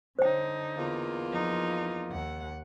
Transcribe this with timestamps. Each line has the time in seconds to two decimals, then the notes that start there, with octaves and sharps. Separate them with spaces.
0.19 D3 D#4 C5 C#5 G5
0.76 E2 A#3 F4
1.29 F3 D#4
2.11 D#2 F#5